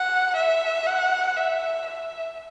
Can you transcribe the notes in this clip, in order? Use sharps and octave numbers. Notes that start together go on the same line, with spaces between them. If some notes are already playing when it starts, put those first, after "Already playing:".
Already playing: F#5
E5
F#5
E5
E5